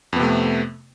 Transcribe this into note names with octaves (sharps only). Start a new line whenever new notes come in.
F2 C3 A3 B3